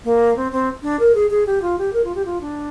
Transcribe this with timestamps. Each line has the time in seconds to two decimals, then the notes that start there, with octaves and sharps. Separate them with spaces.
0.04 A#3
0.36 C4
0.52 C4
0.83 D4
0.99 A#4
1.15 G#4
1.31 G#4
1.46 G4
1.62 F4
1.78 G4
1.93 A#4
2.04 F4
2.15 G4
2.25 F4
2.41 D4